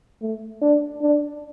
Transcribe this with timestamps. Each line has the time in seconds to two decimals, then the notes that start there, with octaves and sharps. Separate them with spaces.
0.22 A3
0.62 D4
1.02 D4